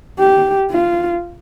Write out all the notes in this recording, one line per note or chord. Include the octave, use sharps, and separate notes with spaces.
G4
F4